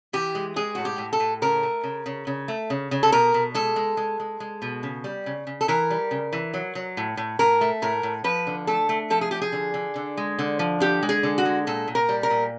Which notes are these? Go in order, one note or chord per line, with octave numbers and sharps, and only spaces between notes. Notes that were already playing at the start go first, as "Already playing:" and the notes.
E3 G4
G#3
G#3 G#4
A2 F#4
G4
A2
A4
A2
C#3 A#4
A3
C#3
C#3
C#3
A3
C#3
C#3
A4
B2 A#4
B2
G#3 A4
G#3
G#3
G#3
G#3
B2
C#3
G3
C#3
C#3
A4
E3 A#4
G3
C#3
E3
F#3
F#3
A2
A2
A2 A#4
A3
A2 A#4
A2
F3 B4
D3
A3 A4
A3
F3 A4
G#4
F3 G4
G#4
D3
D3
D3
G#3
D3
F3
D3 G4
G#3
G#4
D3
F#4
G#3
A#2 A4
A#2
A#4
G3
A#4
A#2